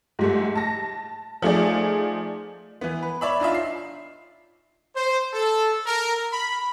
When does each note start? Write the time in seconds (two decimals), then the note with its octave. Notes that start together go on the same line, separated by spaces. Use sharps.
0.19 G#2 G3 A3
0.55 A5 A#6
1.42 F3 A3 D#4 G#4 D5
2.81 E3 B3
3.03 B4
3.21 C#5 D5 E5 B5
3.40 D4 D#4 F4 E5
3.54 C7
4.96 C5
5.33 A4
5.86 A#4
6.32 B5